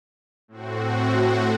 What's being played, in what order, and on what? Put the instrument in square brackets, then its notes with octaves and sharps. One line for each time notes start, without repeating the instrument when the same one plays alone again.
[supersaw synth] A2 C4 F#4